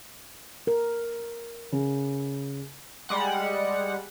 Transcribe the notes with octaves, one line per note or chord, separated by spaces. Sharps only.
A#4
C#3
G3 G#3 F#5